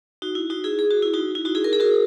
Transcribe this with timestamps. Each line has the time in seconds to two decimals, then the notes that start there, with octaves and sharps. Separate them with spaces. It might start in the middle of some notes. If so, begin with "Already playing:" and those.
0.22 D#4 F#4
0.35 E4
0.50 D#4 F#4
0.64 E4 G#4
0.79 G#4
0.91 F#4
1.02 E4
1.14 D#4 F#4
1.35 E4
1.45 D#4 F#4
1.55 E4 G#4
1.64 A#4
1.73 G#4
1.80 F#4 A#4